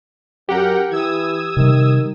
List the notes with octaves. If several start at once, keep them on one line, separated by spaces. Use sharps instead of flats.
F#2 G4 A#4 F#5 G5
E3 D#6 E6 G#6
C3 D#3 G3